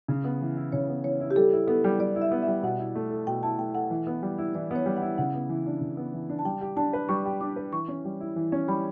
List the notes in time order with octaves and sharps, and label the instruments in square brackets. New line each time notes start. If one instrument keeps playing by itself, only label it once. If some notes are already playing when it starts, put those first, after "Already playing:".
[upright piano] C#3
B3
E3
E4
[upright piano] C#3 [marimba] C#5
[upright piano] B3
[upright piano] E3 [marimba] C#5
[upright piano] E4
[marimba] G4
[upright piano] G3 [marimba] A4
[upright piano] E4
[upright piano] B3 [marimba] A4
[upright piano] G3
[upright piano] G3 [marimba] D5
[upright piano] E4
[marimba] E5
[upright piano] B3
[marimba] E5
[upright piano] G3
[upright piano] B2 [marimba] F#5
[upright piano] E4
A3
A4
[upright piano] B2 [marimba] G5
[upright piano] E4 [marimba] A5
[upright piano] A3 [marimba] G5
[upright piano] A4 [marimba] F#5
[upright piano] E3
B3
G3
E4
[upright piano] E3 [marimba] D5
[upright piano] B3 [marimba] C#5
[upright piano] G3
[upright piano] E4 [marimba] F#5
[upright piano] C#3 [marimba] F#5
[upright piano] B3
E3
D4
C#3
B3
E3
D4
[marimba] A5
[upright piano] G3 [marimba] G5
[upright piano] G4
[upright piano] D4 [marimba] A5
[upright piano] B4
[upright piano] G3 [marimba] C#6
[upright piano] G4
[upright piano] D4 [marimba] D6
[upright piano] B4
[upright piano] E3 [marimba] C#6
[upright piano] C#4
G3
E4
E3
C#4
[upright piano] G3 [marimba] B5